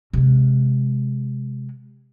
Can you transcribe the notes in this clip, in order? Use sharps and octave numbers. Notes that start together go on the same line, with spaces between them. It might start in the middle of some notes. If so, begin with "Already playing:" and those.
C3 G#3